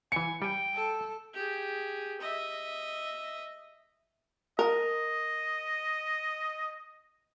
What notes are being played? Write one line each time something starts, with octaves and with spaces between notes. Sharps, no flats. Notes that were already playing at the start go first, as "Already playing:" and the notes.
E3 F5 G#5 C#7
G3 G5 G#5
A4
G4 G#4
D#5 E5
A#4 D#5